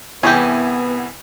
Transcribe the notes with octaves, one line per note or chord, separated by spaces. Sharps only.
C2 E3 B3 G4 G#4 C#5 G#5